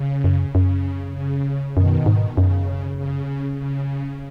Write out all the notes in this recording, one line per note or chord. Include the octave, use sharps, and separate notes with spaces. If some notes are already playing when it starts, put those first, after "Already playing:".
Already playing: C#3
F#2
F#2 C#3
C#3
F#2 B2 D#3
G#2
F#2 C#3
C#3
C#3